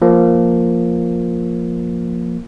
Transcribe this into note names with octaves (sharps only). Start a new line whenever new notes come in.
F3 A#3